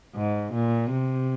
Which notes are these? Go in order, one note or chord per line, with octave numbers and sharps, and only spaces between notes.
G#2
A#2
C3